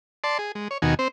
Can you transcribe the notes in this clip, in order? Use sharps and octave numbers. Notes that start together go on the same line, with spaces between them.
D5 A5 C6
G#4
G#3
C#5
D#2 B2 D#3 F#4 G#5
C4 C5